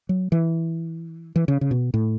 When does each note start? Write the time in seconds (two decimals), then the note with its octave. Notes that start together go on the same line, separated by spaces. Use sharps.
0.09 F#3
0.32 E3
1.36 E3
1.48 C#3
1.61 C#3
1.71 B2
1.94 A2